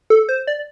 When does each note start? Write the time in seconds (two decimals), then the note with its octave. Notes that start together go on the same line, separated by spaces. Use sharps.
0.10 A4
0.29 C5
0.47 D5